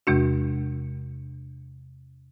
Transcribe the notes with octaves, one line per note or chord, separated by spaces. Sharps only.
E2 C3 G#3 D4 F#4